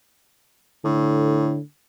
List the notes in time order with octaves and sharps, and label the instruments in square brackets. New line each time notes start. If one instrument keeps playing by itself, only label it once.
[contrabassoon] A2 [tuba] D3